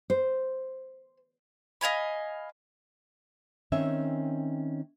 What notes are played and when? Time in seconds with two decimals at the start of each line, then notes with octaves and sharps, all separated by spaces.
0.10 C5
1.81 D#5 F5 G#5 B5
3.72 D#3 C4 C#4 C#5 E5 G#5